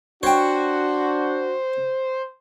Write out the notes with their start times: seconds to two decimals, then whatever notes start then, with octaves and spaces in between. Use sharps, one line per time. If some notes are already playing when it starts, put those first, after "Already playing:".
0.23 D4 F#4 C5 C#5 G5